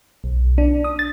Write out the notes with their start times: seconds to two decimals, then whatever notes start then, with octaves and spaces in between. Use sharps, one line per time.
0.24 B1
0.58 D4
0.84 D#6
0.99 A6